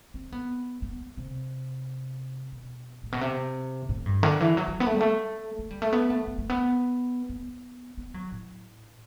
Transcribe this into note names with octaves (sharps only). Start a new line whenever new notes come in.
C4
B3
B3
C3
B2
A2
B2
C3
A2
G2
D3
E3
F#3
F#3
B3
A3
G3
A3
A3
G3
A3
B3
A3
A3
A3
B3
B3
B3
F#3
A2